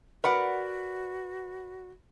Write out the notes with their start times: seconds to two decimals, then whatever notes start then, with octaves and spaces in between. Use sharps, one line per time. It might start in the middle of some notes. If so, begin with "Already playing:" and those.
0.24 F#4 A#4 B4 D5 F#5 B5